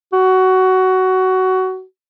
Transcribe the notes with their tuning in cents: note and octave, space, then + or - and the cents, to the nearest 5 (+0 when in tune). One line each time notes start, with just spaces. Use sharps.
F#4 +15